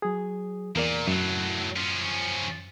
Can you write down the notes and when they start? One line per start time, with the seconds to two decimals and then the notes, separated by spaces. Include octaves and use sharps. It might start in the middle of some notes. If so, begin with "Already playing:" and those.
0.02 F#3 G#4
0.76 E2 A#2 A#4 D5
1.07 F#2 A2 F#3
1.77 F3 C#4